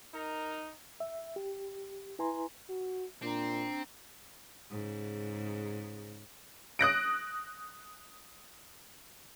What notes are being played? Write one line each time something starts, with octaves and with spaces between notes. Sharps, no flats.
D#4 A#4
E5
G4
E4 B4 G#5 A#5 C6
F#4
A#2 C4 D4 A#5
G#2 C#3
D#6 F#6 A#6 D7